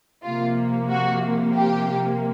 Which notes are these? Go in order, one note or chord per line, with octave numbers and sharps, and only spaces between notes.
C3 F3 A#3 F4
F#4
G4